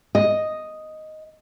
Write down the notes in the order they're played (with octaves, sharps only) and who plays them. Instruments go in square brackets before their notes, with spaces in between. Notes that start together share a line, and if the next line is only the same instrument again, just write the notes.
[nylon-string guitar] D#5